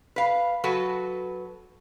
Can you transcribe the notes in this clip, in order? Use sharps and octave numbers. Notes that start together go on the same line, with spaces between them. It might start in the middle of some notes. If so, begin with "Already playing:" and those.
B4 F5
F#3 F#4 A4 B4